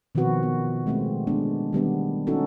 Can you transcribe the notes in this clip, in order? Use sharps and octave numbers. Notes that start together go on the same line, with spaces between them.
B2 D#3 F3 C4 F#4 B4
B3
G#3 A3 C4
G#3 B3 D4
D#3 G3 B3 D4
C#4 D#4 F#4 A4